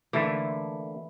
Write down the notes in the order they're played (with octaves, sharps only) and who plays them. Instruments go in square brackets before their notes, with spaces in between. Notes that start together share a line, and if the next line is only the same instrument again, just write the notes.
[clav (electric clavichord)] D3 A3 A#3 [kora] E3